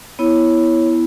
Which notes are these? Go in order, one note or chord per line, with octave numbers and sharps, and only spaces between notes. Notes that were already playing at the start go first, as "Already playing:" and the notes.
B3 E4 C#5